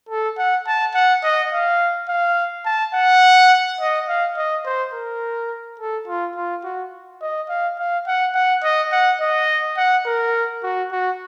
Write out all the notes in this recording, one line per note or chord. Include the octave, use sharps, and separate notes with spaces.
A4
F#5
A5
F#5
D#5
F5
F5
A5
F#5
D#5
F5
D#5
C5
A#4
A4
F4
F4
F#4
D#5
F5
F5
F#5
F#5
D#5
F#5
D#5
F#5
A#4
F#4
F#4